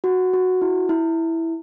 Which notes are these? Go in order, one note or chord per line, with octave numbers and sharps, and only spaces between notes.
F#4
F#4
E4
E4